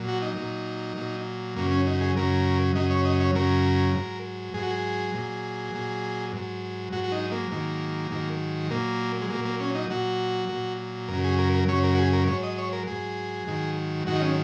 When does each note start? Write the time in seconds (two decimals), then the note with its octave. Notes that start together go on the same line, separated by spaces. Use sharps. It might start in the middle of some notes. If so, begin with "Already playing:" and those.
Already playing: A#2 F#3
0.08 F#4
0.22 D#4
0.37 A#2 F#3
0.97 A#2 F#3
1.56 F#2 C#3 F#3 A#3
1.71 C#4
1.87 D#4
2.01 G#4
2.16 F#2 C#3 F#3 A#4
2.75 F#2 C#3 F#3 D#5
2.91 C#5
3.05 D#5
3.20 C#5
3.35 F#2 C#3 F#3 A#4
3.94 G#2 F#3
4.54 G#2 F#3 G#4
4.63 F#4
4.71 G#4
5.14 A#2 F#3
5.74 A#2 F#3
6.33 G#2 F#3
6.93 G#2 F#3 F#4
7.04 F#4
7.12 D#4
7.32 A#3
7.52 G#2 D#3 F#3
8.11 G#2 D#3 F#3
8.70 A#2 F#3 A#3
9.22 G#3
9.30 A#2 F#3 A#3
9.45 A#3
9.60 C#4
9.75 D#4
9.90 A#2 F#3 F#4
10.49 A#2 F#3
11.08 F#2 C#3 F#3 A#4
11.24 G#4
11.39 A#4
11.54 A#4
11.68 F#2 C#3 F#3 C#5
11.83 A#4
11.95 F#4
11.98 G#4
12.13 A#4
12.27 G#2 F#3 C#5
12.43 D#5
12.58 C#5
12.72 A#4
12.87 G#2 F#3 G#4
13.47 G#2 D#3 F#3
14.07 G#2 D#3 F#3 F#4
14.15 D#4
14.21 C#4